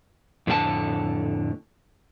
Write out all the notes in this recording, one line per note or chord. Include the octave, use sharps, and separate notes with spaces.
F2 A2 D3 E4 A5